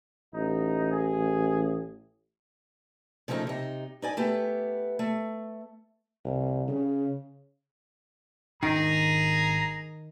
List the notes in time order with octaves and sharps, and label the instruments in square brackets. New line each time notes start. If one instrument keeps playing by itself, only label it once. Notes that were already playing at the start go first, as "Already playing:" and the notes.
[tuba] A1 [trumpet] D#4
[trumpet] G#4
[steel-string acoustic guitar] C#3 F3 A3 C#4 D#4
C3 D#4
D#4 D5 G#5
A3 B3 G4
A3
[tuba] C2
C#3
[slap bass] G#1 D4 [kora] D#3 [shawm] G#4 [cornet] A#5